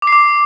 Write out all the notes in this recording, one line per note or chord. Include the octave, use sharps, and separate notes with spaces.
D6
C7
D6